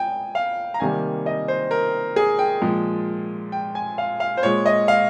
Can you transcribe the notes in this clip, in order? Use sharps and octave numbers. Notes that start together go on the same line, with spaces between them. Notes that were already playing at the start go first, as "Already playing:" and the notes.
Already playing: G5 G#5
F5
A#5
C3 D#3 G3 A#3 G#5
D#5
C5
A#4
G#4
G5
A#2 F3 G#3
G5
G#5
F5
F5
C5
A#2 G#3 C#5
D#5
F5